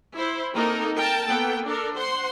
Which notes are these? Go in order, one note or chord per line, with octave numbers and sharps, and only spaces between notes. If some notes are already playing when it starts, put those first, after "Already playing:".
E4 C5
A#3 C4 D#4 A4 A#4
A#4 G5 A5
A#3 B3 A4 G5
D4 A4 A#4
C5 F#5 C6